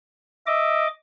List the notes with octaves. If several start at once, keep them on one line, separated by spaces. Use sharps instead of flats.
D#5 E5 D6